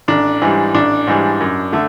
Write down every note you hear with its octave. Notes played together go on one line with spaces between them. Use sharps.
A1 D4
G#2 E3 G3
A1 D4
G#2 E3 G3
F#2
D3 A3